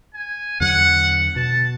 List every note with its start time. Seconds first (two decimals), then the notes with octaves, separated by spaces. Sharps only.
0.14 G#5
0.60 E2 D3 F#3 F#5
1.36 B2 A5